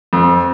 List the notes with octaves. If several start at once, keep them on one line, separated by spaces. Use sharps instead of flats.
F2